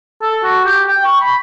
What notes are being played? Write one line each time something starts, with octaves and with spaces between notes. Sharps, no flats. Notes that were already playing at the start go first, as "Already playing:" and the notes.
A4
F#4
G4
G5
C#6
B5